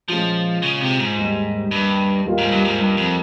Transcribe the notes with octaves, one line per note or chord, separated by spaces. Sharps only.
A#2 F3 G#3 C#4 F4
C#3
C3
G#2
D#2 D#3 G3
G2
D#2 D#3 G3 A#3 F4
G#2
G2
G#2
G2
F2